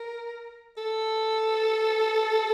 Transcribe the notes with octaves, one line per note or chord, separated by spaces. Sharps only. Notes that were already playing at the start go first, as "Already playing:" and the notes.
Already playing: A#4
A4